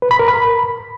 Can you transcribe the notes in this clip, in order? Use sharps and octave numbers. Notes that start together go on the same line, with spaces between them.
B4
B5
A#4
B5